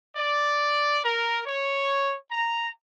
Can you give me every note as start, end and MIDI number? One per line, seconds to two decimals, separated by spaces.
0.15 0.99 74
1.04 1.40 70
1.45 2.15 73
2.31 2.69 82